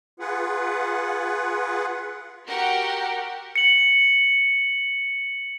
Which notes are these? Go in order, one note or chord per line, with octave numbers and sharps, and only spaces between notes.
F4 G#4 B4 F#5
F#4 G4 A#4 F#5 G5
C#7 F#7